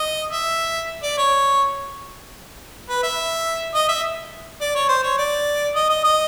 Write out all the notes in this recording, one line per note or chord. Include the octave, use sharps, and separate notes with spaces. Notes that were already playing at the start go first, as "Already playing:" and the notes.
Already playing: D#5
E5
D5
C#5
B4
E5
D#5
E5
D5
C#5
C5
C#5
D5
D#5
D#5
D#5